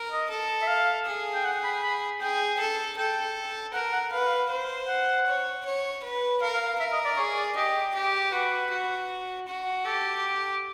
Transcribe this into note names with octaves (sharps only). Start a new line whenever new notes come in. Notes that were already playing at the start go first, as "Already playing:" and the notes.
Already playing: A#4
D#5
A4
E5
F5
G#4
G5
F#5
B5
B5
G#4 G5
A4
A4 G5
A#4 F#5
F#5
B4 F5
F#5
F5
C5
F#5
C#5
C#5
B4
A#4 F5
F5
F5
A#4 E5
D#5
D5
G#4 C#5
D5
G4 D#5
G4
F#4 B4
F#4
F#4
G4 A4